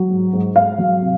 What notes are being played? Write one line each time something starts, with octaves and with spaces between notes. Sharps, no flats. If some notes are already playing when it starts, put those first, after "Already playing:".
Already playing: F#3
G#2
G#2
G#2 F5
F#3
C3